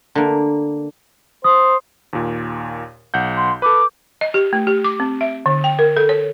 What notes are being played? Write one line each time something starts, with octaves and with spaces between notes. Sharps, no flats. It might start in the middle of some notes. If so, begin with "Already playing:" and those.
D3 A#3
C5 D#6
D#2 A#2
B1 F#5 G6
C6
A4 B4 D6
D#5
G4
A3
G4
D6
C4
E5
D3
G5
A#4
A4
C#5